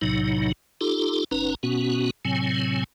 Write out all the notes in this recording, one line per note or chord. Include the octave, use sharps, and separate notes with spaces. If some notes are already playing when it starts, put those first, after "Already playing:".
B1 A2 C3 F#3 D#4
D#4 F4 G4 A4
F#1 C#4 D#4 B4 A#5
B2 B3 C#4 F#4
A2 C3 F#3 C4 G#5